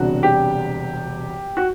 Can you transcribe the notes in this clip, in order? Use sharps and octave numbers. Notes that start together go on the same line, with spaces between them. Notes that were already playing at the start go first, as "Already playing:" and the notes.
Already playing: E1 D2 C3 G3 D4 F#4
G4
F#4